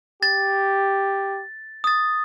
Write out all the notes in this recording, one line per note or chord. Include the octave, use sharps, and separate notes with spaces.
G4 A6
D#6 A6